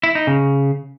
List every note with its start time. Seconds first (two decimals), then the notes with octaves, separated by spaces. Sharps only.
0.03 E4
0.15 D#4
0.27 C#3